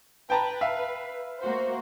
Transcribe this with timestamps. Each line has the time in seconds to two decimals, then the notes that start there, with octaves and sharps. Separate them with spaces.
0.30 B4 G5 A5 A#5
0.61 E5 F5
1.40 A#3 F#4 C5